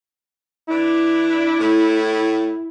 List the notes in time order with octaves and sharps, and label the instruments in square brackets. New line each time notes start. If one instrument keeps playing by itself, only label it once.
[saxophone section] E3 D4 [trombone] E4
[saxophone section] A2